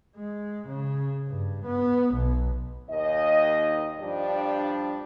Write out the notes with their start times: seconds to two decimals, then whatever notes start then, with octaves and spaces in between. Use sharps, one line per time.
0.16 G#3
0.68 C#3
1.28 G2
1.66 B3
2.14 B1
2.90 D#2 D#5
3.99 G2 F3 G3 D4